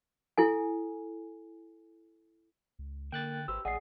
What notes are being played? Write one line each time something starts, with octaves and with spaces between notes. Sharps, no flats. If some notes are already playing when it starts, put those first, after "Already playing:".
E4 A4 G#5
C#2
D3 A#3 G5 F#6 A6
G#1 G4 B4 C5 E6
A1 D2 G#4 D5 D#5 F#5 C7